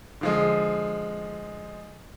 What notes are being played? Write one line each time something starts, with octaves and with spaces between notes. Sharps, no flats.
D3 F3 G#3